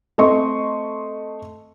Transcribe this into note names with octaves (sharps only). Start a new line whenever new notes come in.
A3 C4 D#5 C6 C#6